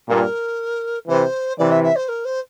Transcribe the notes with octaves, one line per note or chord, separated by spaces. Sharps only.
G2 A#2 A#4
C3 E3 C5
C3 E3 D5
E5
E5
C5
A#4
C5